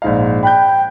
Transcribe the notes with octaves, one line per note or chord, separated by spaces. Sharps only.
A#1 G#2 F5
G5 B5 F#6 G6